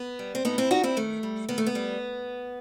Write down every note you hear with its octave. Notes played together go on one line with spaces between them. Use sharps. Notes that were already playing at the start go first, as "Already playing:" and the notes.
Already playing: B3
G3
C4
A2 B3 D#4
C4 E4
G3 D#4 F#4
C4 E4
D#3 A3
G3
D#3 B3
A3
B3
G3